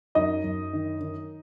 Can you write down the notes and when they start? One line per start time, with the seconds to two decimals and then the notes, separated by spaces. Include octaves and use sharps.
0.15 F#2 D#4 D#5
0.44 F#2
0.73 D#3
1.01 D#3